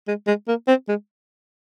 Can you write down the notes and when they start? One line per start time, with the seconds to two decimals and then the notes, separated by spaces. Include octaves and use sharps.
0.08 G#3
0.27 G#3
0.48 A#3
0.68 C4
0.88 G#3